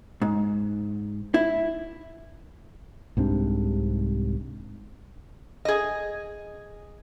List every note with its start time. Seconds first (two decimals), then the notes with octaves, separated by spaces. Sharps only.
0.22 G#2
1.34 E4
3.17 C2 G#2 C3 D4
5.65 G#4 D#5